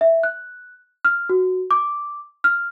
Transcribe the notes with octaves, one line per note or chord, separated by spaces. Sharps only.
E5
F#6
F6
F#4
D6
F6